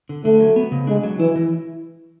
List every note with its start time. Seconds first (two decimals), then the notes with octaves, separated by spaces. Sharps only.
0.09 D3
0.25 D3 A3
0.40 F#3
0.56 B3
0.72 C#3
0.87 G#3 D4
1.03 F#3
1.19 E3 E4
1.36 E3